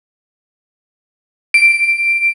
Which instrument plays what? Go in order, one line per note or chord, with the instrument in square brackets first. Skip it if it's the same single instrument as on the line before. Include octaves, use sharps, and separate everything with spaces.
[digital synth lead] D7